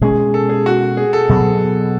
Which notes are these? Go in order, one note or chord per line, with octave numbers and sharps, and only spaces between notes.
B2 G#3 C#4 G#4
A4
G#4
F#4
G#4
A4
B2 F#3 B3